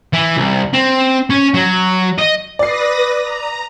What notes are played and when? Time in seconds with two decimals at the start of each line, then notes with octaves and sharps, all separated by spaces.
0.13 E3
0.37 C2
0.73 C4
1.30 C#4
1.54 F#3
2.18 D#5
2.59 B4 D5 D#6 A#6 C7
3.22 A#5